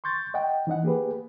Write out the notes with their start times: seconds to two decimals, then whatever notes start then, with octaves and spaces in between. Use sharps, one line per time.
0.04 C6 C#6 G6 A6
0.34 D#5 F#5 G5
0.67 E3 D#4 D#5 F#5
0.83 A#3 G4 G#4 B4